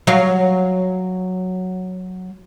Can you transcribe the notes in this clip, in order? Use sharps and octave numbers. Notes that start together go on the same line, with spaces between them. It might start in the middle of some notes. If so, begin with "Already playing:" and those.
F#3 F5